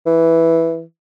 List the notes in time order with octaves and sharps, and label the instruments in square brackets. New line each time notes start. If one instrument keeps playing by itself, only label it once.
[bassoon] E3